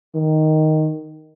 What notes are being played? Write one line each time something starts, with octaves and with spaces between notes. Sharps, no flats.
D#3